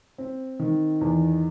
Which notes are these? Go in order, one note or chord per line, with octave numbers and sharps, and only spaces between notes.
C4
D#3
E2